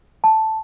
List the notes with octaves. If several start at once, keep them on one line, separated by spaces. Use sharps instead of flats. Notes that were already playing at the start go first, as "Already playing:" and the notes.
A5